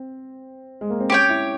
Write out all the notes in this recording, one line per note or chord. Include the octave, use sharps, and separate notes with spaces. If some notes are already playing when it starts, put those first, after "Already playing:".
Already playing: C4
G#3
A#3
C4
C#4 G4 C#5 G5
E4